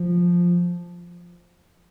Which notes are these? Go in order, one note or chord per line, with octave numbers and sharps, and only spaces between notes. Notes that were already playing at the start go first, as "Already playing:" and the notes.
Already playing: F3